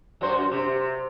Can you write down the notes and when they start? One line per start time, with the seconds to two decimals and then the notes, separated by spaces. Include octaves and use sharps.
0.21 F#2 F#4 C5
0.51 C3